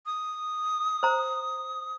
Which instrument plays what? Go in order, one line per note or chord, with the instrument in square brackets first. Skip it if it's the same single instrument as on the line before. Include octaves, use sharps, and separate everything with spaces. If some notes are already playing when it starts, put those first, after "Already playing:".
[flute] D#6
[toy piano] C5 A#5